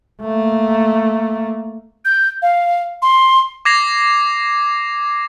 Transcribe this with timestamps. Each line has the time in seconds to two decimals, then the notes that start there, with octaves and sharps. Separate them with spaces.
0.21 A3 A#3
2.05 G6
2.42 F5
3.02 C6
3.65 D6 G#6 A#6 C7 F7